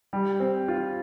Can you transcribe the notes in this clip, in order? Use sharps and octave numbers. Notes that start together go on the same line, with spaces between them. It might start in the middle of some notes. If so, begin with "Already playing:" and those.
G3
C4
F4